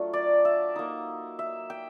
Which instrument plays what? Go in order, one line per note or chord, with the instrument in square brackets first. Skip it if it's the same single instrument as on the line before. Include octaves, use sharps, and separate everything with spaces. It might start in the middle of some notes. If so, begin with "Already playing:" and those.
Already playing: [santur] F#3 A3 D4 F4
D5
E5
A#3 D#4
E5
G5